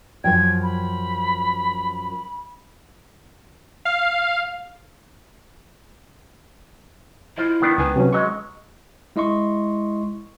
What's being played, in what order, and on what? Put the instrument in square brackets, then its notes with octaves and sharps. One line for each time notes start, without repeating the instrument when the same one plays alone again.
[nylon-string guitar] F#2 F3 G5 [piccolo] G#6
[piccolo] B5
[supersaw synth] F5
[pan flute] E4 [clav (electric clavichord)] F4 C5 D#5
[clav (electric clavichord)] D#3 B3 D4
[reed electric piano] C#2 G#5 [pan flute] B4
[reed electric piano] C3 F#3 C#4
[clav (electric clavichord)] F#3 G#3 [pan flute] D#5 [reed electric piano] C#6
[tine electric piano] G#3 E4 D#5 C6 C#6